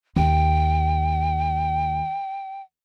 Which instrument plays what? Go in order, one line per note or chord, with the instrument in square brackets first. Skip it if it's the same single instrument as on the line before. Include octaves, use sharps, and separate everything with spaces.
[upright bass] D#2 [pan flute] G5